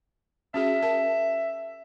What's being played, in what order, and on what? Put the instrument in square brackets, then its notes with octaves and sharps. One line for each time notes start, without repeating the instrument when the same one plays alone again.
[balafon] C#4 F#4 G#4 [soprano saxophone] E5
[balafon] A#4 A5